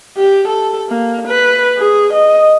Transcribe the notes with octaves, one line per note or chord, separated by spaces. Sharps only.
G4
A4
A#3
B4
G#4
D#5